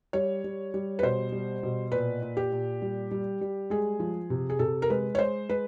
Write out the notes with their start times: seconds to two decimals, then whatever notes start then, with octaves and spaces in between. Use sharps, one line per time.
0.13 G3 C#5
0.44 G3
0.74 G3
0.99 B4
1.02 B2 C5
1.32 G3
1.63 B2
1.92 A#2 B4
2.22 A#2
2.37 G4
2.52 A#2
2.82 G3
3.11 G3
3.41 G3
3.70 G#3 G#4
4.00 F3
4.30 C3
4.50 G#4
4.59 C3 A4
4.82 A#4
4.90 G#3 B4
5.15 C#5
5.19 G#3 C5
5.49 G#3 B4